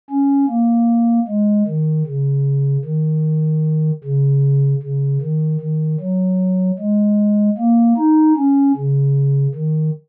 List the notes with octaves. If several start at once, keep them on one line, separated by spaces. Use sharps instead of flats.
C#4
A#3
G#3
D#3
C#3
D#3
C#3
C#3
D#3
D#3
F#3
G#3
A#3
D#4
C#4
C#3
D#3